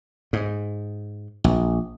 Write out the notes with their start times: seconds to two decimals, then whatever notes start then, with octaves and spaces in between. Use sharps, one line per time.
0.33 G#2
1.44 A#1